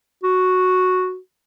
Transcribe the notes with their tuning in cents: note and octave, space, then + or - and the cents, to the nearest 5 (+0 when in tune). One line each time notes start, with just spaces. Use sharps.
F#4 -5